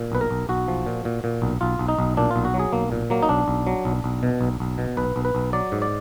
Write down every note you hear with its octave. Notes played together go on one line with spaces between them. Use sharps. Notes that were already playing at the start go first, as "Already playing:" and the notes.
Already playing: A#2
B1 B4
A#4
B1
B1 F#4
F3
A#2
A#2
A#2
B1
B1 F4
B1
D#4
B1
A#2 D4
F4
B1
F#4
F#3
G#4
B1 A#3
A#2
F#3 A#3
D#4
B1 D4
B1
F#3
B1
B1
B2
B1
B1
B2
B1 B4
B1
B4
B1
F#3 D5
G#2
D5